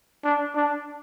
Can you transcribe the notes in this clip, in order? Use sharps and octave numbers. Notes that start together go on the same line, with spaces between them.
D4
D4